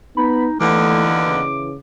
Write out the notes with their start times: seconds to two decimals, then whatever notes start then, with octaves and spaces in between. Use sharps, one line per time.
0.17 B3 D#4 B5
0.60 D#2 D3 E3 A3 B3 D6
1.26 C#3